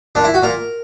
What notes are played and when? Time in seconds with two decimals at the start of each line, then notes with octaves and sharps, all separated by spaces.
0.15 A#2 D4
0.24 E4
0.34 F#4
0.43 A#2 A#4